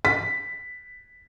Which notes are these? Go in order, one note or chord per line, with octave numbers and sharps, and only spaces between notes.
B6